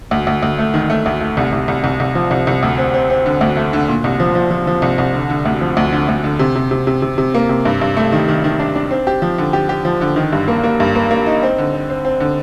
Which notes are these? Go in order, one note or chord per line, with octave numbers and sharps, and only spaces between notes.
D2
D2
D2
A3
D#3
A3
D2
A3
C2
C2
C2
C2
C2
F3
C2
C2
D2
C4
C4
C4
D3
D2
A3
D3
A#2
C2
F3
F3
F3
F3
C2
C2
D3
D3
D2
F3
D2
D3
D2
D3
C3
C3
C3
C3
C3
C3
A#3
C3
G2
G2
A3
D#3
D#3
D#3
D4
D4
C4
G4
F3
D3
G4
G4
F3
D3
D#3
G2
A#3
A#3
G2
A#3
A#3
D#4
C4
D3
C4
C4
C4
D3